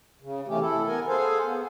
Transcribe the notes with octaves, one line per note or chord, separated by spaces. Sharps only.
C#3
C3 E3 A3 C#4 G4
E4 A4
B3 A#4 G#5
G#4 A4 C5 F5 G#5
B3